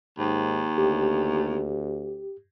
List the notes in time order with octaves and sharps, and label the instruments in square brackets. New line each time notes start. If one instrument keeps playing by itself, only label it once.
[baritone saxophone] D#2 [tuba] G#2
[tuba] D2 [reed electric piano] G4